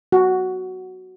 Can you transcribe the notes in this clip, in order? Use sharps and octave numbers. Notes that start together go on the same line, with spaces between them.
F#4